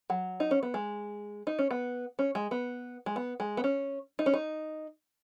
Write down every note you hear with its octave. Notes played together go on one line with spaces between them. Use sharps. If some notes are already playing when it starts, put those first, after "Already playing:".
F#3
D#4
C#4
B3
G#3
D#4
C#4
B3
C#4
G#3
B3
G#3
B3
G#3
B3
C#4
D#4
C#4
D#4